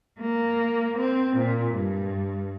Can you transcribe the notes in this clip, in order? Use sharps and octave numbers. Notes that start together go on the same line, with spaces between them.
A#3
C4
A#2
G2